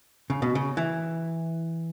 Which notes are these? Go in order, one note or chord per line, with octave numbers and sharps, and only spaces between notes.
C#3
B2
C#3
E3